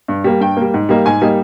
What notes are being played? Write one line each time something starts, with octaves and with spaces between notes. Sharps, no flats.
G2
G3 A#3
G2 G5
G3 A#3
G#2
G3 A#3 D#4
G#2 G#5
G3 A#3 D#4